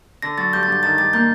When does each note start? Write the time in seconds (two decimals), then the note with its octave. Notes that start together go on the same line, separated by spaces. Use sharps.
0.22 D3 A#6
0.38 F#3 A6
0.53 G2 G6
0.63 A6
0.68 G2 G6
0.83 D#3 A6
0.98 G3 A6
1.13 A#3 G6